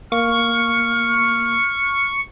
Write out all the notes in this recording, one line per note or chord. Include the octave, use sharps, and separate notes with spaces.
A#3 C#6 F6